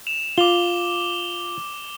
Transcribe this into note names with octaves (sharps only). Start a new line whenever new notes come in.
E7 F7
F4 D6 F7 G7